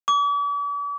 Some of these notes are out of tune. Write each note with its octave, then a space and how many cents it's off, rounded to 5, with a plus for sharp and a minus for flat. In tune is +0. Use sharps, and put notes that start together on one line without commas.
D6 -45